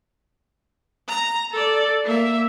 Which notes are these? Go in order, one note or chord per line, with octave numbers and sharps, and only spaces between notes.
A#5
A4 D5
A#3 E5